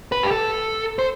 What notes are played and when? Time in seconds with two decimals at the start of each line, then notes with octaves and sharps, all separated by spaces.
0.12 B4
0.23 G4
0.31 A4
0.99 C5